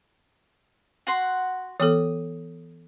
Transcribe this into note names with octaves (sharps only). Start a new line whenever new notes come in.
F#4 F#5 C6
E3 B3 A4 D#6